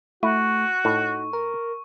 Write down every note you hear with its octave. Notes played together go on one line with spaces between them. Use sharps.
A3 E4 F#4 C#6
A2 D#4
A#4